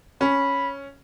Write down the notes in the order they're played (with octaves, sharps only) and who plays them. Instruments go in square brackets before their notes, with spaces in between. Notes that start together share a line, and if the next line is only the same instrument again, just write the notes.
[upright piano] C#4 [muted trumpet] B5